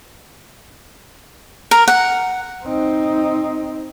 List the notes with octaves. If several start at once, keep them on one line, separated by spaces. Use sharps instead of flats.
A#4
F#5
C4 D#4